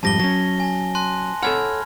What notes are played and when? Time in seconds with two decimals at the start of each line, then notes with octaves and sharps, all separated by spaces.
0.03 F2 G#2 G3 A5 A#6 G7
0.20 F#3 C#4 A#6
0.60 G#5 A#6
0.95 A5 C6 F#6
1.42 A4 C#5 F#5 B5 F6 G#6